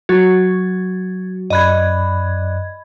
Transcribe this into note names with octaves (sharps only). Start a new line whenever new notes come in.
F#3 F#4 G#6 A6
F#2 D5 D#5 B5 F#6 G#6